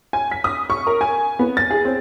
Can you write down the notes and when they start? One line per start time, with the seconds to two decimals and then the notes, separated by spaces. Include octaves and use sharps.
0.13 G#5
0.31 B6
0.44 D#6
0.70 C#6
0.87 A#4
1.01 G#5
1.39 B3
1.57 A6
1.70 G#4
1.85 C4